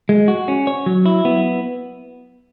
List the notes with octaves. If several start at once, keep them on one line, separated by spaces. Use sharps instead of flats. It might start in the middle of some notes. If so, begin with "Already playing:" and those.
G#3
F#4
C#4
C#5
F#3
E4
B3